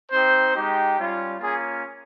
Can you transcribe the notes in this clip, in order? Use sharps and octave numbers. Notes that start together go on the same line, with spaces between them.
C4 D#4 G4 C5
G#3 D#4 G4
G3 C#4 F4
A#3 C#4 F4 G#4